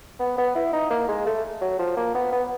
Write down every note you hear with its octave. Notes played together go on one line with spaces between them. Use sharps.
B3
B3
E4
D#4
A#3
G#3
A3
F#3
F3
A#3
B3
B3